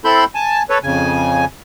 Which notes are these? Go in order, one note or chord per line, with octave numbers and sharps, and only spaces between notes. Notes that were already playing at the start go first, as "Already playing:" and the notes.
C4 E4 A4 B5 C6 G6
G#5 A5
A4 B4 C#5
F2 C#3 G#5